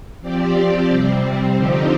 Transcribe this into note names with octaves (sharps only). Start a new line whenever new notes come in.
F3 C4 G4 D5
C3 G3 C4
D3 F3 C4 D#4 G4